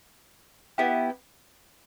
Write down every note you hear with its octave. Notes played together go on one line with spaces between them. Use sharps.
B3 E4 G4